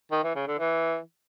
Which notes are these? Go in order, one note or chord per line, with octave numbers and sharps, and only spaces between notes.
D#3
E3
C#3
D3
E3